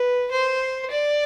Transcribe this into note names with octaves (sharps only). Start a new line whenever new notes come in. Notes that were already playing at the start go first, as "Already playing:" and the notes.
Already playing: B4
C5
D5